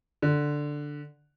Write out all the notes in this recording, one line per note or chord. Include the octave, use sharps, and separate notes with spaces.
D3